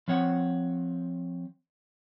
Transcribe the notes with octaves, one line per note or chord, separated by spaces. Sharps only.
F3 C4 C#5 F#5